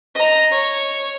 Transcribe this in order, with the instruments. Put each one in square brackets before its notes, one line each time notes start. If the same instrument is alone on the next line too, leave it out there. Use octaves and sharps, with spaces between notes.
[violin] D#5 A#5
C#5